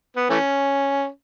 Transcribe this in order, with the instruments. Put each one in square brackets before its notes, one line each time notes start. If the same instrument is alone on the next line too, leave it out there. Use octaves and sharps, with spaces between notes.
[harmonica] B3
E3 A3 C#4